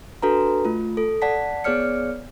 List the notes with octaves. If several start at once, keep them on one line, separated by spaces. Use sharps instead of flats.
D4 F#4 A4 B4 A#5
A3 F4
A4
D5 F#5 A5 B6
B3 G#4 C#5 D5 F6 C#7